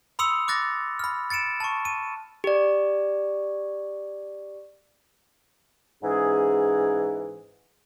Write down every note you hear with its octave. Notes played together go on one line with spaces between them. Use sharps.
B5 C6 D#6 E6 C#7 F7
D6 F#6 A6 A#6
B5 F6
A6 C#7 D7 E7
A5 C#6
D#7
G4 D5
G#2 E3 C#4 G#4